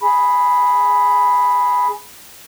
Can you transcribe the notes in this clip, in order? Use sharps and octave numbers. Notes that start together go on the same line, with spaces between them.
G#4 B5